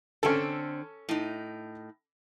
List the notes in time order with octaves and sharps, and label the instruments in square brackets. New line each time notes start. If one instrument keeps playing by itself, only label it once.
[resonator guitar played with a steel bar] D3 C4 [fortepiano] C#4 A4
[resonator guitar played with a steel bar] A2 D#4